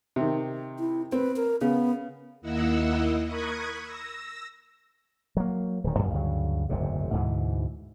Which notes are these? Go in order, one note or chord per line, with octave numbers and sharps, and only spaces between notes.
C3 D#3
E4
C4 B4
A#4
C#3 B3
D#2 A#3 E4 D#5 F#5 E6
A#4 B5 C#6 D#6 F#6 G#6
E6 A#6
F#3 A#3
D1 D#3
A1 F#2
D2 G2 C#3 F#3
F#1 D2 G#2 C3
D2 G#2 B2 E3